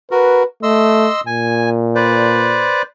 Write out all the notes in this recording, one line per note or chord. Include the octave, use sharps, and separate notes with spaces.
F#4 A#4 B4
A3 D#5 C6 E6
A#2 G#5
B4 C5 D5